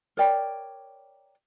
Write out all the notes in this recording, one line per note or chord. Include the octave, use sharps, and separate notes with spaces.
A#4 C#5 D5 G5